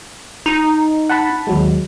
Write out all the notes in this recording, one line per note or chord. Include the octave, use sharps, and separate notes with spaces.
D#4
F#5 A5 B5
D#2 F#3 G#3